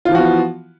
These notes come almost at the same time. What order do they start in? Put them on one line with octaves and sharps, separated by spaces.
F4 E3 F3 F#4 B3